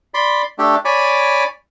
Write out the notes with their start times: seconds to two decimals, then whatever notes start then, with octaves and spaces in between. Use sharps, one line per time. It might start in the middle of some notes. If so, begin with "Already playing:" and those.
0.14 D5 B5 C6
0.58 A3 D4 G4
0.85 C#5 D5 G#5 B5 D6